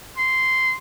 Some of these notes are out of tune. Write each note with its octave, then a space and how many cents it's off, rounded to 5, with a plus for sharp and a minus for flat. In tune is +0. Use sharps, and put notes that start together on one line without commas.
C6 -10